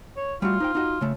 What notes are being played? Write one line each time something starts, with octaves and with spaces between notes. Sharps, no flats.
C#5
G3 A3 F4 F#4
D#4 C5 G5
D#4 F#4 D#5
C#3 A3